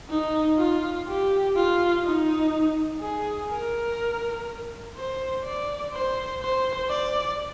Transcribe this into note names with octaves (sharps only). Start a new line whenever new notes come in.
D#4
F4
G4
F4
D#4
G#4
A#4
C5
D5
C5
C5
D5